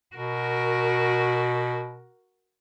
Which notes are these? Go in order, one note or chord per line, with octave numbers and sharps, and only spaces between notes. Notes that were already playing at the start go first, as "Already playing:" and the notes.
B2 F#4 A#4